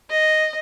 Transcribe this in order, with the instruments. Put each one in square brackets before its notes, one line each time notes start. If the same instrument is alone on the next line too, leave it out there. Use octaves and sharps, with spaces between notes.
[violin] D#5